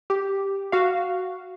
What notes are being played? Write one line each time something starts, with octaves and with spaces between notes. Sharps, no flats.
G4
F#4 F5